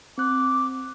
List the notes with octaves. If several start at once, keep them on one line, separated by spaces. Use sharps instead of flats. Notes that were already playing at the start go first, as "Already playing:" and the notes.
C4 D6 F#6